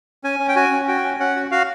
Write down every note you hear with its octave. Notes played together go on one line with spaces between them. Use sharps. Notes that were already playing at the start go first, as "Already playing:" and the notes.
C#4 G#5
C#4
G5
F#4 G#5
C#4
F#4 G5
C#4
C#4 F#5
F#4
F#4 F5